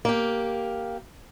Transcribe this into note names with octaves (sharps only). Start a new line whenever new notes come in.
A#3 G4